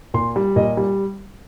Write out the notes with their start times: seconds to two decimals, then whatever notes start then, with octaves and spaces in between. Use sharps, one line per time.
0.14 A#2 C6
0.36 G3
0.56 A#2 D#5
0.77 G3